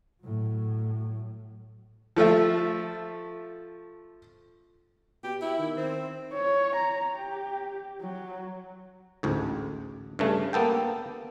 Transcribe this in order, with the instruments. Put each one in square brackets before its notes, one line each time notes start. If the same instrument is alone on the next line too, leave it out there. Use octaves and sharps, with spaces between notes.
[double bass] A2 F#3
[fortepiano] F3 A3 F4 E5
[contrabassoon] B2 [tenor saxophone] G4
[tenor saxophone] E4
[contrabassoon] D#3
[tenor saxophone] C4
[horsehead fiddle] C#5
A#5
G4
F#3
[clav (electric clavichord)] A1 D2 G#2
G2 C#3 A3
A#3 B3 A4 G5